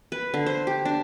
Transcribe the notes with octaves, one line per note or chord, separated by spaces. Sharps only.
B4
D3
C5
G4
D4